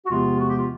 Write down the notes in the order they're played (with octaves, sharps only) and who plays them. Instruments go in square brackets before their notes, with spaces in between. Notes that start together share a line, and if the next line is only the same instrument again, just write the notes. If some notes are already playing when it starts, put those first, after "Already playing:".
[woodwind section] F#4
E2 C3 F3 G#3 B3 F4
F#4
G4
F4